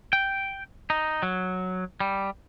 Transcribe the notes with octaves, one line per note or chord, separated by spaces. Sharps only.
G5
D#4
F#3
G3